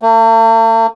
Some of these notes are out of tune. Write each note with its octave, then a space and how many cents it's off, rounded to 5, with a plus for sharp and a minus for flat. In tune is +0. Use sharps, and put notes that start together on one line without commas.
A3 +45